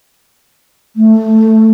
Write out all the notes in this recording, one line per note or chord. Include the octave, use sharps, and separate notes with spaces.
A3